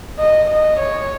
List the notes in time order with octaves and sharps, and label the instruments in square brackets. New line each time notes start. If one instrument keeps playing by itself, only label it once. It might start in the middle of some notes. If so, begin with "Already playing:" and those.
[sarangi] D#5
D#5
C#5